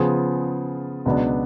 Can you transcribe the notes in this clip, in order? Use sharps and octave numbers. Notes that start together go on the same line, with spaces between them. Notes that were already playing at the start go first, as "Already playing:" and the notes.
Already playing: C#3 F3 B3 F4 G#4
C#2 B2 F#3 B3 D4